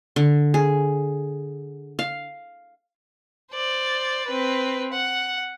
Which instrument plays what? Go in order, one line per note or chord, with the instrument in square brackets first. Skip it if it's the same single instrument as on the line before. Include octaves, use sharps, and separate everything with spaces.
[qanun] D3
G#4
F5
[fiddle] C5 D5
C4 B4
F#5